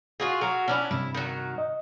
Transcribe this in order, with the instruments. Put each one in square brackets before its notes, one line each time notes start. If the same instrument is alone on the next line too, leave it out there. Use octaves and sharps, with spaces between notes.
[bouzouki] F4 F#4 G#4
F#3 F#4 A#4
C#4 D4 E4
[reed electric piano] G2 C3 [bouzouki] E4
[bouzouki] D#3 F#3
[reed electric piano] D#5